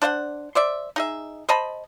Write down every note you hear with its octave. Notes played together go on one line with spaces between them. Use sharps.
D4 C5 F5 F#5
C5 D5 E5
D#4 G#4 E5
C5 D#5 A5 B5